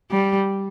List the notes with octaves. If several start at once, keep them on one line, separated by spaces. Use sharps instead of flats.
G3